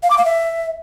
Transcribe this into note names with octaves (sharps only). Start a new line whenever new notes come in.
F5
D6
F5
E5